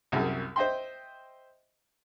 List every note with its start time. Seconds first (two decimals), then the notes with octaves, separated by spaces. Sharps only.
0.12 C2 F#2 G#4
0.56 C5 D#5 E5 G5 C6